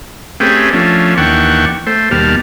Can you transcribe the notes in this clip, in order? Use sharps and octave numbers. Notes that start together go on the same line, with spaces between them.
A3 C4 C#4 G4 G#4 B4
F3 A3 C#4 D4
D#2 E3 D4 F#5 G5 C#6
A3 C5
D#2 B2 G3 A5 F6